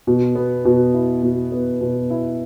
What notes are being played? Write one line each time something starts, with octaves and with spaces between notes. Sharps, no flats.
B2
B3
B2
E4
B2
B3
B2
E4